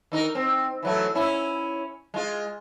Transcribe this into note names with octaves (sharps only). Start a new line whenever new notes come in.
D#3 D#4 A#4
C4
E3 F#3 A3
C#4 E4
G#3 F4